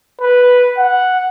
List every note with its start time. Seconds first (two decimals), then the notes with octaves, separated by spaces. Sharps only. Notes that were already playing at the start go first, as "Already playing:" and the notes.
0.21 B4
0.78 F#5